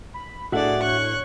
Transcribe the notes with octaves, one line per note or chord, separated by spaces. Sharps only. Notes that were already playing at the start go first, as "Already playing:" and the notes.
B5
A2 D4 F#4 G#4 A4 D5 E5 F#5
D4 C#5 C#6 F#6